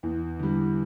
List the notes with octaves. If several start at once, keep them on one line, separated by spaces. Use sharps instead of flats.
E2
D3 G3